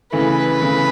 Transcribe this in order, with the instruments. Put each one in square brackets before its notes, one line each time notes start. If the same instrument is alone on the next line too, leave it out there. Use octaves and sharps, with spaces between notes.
[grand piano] C#3 E3 A3 [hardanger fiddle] B4
[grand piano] C#3 E3 A3